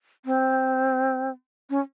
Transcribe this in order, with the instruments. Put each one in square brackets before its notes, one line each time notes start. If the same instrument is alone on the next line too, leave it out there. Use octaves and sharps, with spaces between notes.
[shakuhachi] C4
C#4